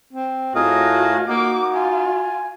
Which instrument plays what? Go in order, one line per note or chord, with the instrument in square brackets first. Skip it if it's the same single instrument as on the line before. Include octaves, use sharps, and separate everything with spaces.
[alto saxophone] C4
[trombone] A2 [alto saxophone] F4 [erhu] F#4 [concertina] G#4 A#4 D#5
[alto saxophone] A#3 [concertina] D#4 [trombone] F#4 [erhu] D6
[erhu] F4 [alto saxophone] G#5